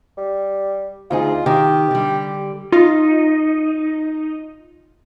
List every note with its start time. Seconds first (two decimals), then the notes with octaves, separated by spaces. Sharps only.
0.17 G3
1.11 D2 D#4 F4 G#4
1.46 D#3 G4
1.91 D3 G3
2.72 D#4 F4